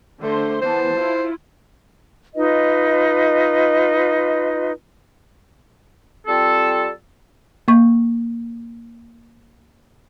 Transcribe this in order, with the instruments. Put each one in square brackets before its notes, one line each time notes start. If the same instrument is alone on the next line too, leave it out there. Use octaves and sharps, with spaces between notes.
[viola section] D3 C5 C6 [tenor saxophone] A3
[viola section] E3 B3 A5 [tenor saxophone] C5
[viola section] E4 F4
[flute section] D#4 F4 B4 D#5
[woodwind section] G3 C4 F4 A4
[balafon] A#3 C#6